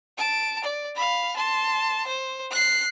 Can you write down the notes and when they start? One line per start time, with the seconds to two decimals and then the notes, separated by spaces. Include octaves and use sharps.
0.18 A5 D7
0.64 D5
0.95 F5 B5
1.36 A5 C6
2.07 C5
2.51 F#6 C7